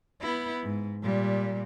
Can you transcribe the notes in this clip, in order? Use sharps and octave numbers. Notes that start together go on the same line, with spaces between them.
B3 E4
G#2
A#2 G3